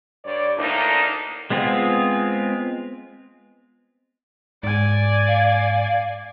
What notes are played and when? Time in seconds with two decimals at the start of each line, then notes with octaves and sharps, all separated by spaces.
0.25 G2 C#5 D5
0.58 D2 A2 A#3 D4 D#4
1.50 G#3 B3 C4 F4 G#4
4.63 G#2 D5 G#5
5.27 F5